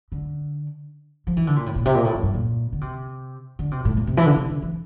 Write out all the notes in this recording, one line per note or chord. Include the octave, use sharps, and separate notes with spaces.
D3
F3
E3
D3
A#2
A2
A#2
C3
A#2
A2
F2
G2
A#2
D3
C3
D3
C3
A2
A#2
C3
E3
D3
C3
D3
E3